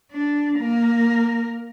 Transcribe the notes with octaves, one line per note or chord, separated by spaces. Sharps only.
D4
A#3 A#4